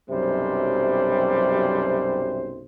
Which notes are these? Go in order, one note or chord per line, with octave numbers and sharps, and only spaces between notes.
B1 F#2 C3 G3 C5